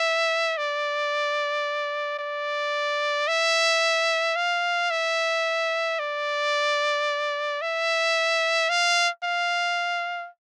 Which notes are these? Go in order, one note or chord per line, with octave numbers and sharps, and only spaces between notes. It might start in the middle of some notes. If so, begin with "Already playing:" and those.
Already playing: E5
D5
D5
E5
F5
E5
D5
E5
F5
F5